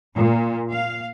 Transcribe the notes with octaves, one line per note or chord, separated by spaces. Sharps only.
A#2
F5